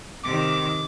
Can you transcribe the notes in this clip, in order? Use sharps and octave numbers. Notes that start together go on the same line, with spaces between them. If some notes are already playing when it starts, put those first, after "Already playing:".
C3 D#3 D6